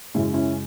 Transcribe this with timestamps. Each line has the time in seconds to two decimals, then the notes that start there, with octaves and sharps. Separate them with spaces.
0.15 F#2 C#3 G#3 C#4 E4
0.33 C#4 E4